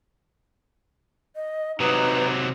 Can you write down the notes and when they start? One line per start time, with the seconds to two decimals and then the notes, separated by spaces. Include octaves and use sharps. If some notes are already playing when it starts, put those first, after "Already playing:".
1.36 D#5
1.80 C3 F#3 D#4 B4